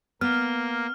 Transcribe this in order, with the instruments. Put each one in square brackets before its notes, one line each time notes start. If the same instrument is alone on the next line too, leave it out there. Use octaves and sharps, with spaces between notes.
[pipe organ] A#3 [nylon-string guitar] B3 [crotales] F6